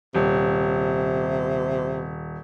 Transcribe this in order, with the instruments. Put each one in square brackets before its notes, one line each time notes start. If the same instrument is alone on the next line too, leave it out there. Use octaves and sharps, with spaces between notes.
[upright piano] D#1 [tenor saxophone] C3